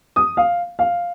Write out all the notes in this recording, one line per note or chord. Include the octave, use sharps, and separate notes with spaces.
D#6
F5
F5